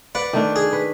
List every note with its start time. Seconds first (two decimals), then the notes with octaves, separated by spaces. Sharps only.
0.15 B4 D5 F#5
0.33 D#3 A3 D4
0.56 G#4
0.73 B4